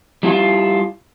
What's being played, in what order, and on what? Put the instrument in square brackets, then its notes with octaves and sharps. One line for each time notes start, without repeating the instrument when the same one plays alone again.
[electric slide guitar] G3 E4 F4